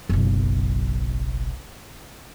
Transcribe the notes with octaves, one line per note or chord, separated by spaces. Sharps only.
F#1 B1